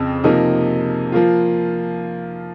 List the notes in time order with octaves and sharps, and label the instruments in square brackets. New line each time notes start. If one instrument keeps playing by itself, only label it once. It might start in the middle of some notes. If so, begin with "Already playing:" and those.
Already playing: [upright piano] F2 C#3 C4
C3 F3 A#3 D#4
F3 A#3 F4